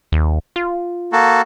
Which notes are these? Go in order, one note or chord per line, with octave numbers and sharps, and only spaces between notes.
D#2
F4
A#3 F#4 A4